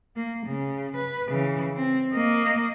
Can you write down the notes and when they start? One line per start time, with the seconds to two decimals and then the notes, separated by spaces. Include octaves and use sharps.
0.16 A#3
0.46 C#3
0.96 B4
1.28 C#3 E3
1.76 C4
2.13 A#3 D#5